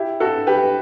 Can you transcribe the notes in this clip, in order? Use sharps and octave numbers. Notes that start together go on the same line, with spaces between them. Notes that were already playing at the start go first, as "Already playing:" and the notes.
Already playing: E4 G4
F#4 A4
G4 B4